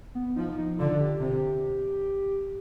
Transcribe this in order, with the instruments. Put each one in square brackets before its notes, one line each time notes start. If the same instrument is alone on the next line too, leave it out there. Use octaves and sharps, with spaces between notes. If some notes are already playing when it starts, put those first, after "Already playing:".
[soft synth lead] B3
[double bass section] F3 [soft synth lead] D#4
[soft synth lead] D#4
[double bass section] D3 [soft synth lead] F4
[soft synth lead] G4
[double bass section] C3